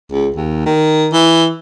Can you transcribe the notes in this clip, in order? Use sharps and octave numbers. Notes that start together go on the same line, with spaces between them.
C#2
D#2
D#3
E3